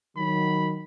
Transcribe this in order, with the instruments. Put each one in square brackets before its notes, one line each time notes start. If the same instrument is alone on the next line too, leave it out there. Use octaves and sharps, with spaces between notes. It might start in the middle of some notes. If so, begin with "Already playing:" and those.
[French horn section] D#3 F#3 [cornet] B5